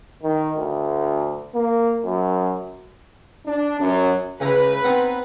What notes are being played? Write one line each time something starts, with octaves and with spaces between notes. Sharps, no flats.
D#3
D2
A#3
F#2
D4
F#2
C#2 E4 B4 A#5
B3 C4 D#4